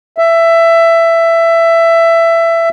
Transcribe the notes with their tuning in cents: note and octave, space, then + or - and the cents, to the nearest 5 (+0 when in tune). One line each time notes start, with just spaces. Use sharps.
E5 +15